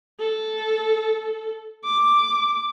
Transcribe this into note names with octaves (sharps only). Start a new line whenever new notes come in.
A4
D6